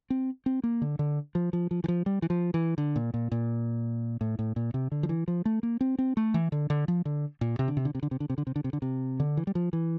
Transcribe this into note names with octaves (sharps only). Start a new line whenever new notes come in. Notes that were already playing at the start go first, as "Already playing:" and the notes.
C4
C4
A#3
D3
D3
F3
F3
F3
E3
F3
G3
E3
F3
E3
D3
A#2
A#2
A#2
A2
A2
A#2
C3
D3
F3
E3
F3
A3
A#3
C4
C4
A3
E3
D3
D3
F3
D3
A#2
C3
D3
C3
D3
C3
D3
C3
D3
C3
D3
C3
D3
C3
D3
C3
D3
E3
G3
F3
E3